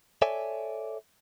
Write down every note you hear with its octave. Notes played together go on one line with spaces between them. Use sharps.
A4 C#5 D5 E5 G#5